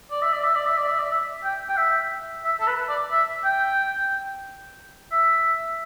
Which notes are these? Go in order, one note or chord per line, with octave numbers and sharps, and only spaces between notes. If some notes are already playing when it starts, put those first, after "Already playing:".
D5
E5
D5
E5
D5
E5
D5
E5
D5
E5
G5
G5
E5
E5
A4
B4
D5
E5
G5
E5